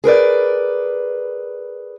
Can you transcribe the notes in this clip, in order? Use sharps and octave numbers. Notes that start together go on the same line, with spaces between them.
G#4 A#4 B4 D5